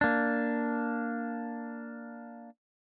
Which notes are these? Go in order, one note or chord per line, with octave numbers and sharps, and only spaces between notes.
A#3 D4